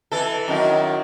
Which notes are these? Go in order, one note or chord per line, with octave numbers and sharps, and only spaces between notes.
E3 A4
F#2 D#3 E4